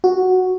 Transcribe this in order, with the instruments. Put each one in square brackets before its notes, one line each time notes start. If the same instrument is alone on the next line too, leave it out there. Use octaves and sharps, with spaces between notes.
[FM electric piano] F#4